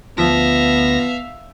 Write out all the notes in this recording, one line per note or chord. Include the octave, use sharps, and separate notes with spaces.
D2 F3 B3 E5 F5 A#6